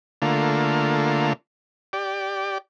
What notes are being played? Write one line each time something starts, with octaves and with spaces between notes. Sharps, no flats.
D3 A3 A#3 F4
G4 D5